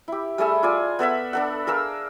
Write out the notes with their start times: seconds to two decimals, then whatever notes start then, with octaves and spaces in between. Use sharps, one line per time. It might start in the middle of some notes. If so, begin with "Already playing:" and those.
0.08 E4 G4
0.38 G3 A3 G#4 E5
0.63 F4 D5 G#5
0.99 B3 A4 E5 B5
1.33 D4 A4 F#5
1.67 G#4 A#4 F5 E6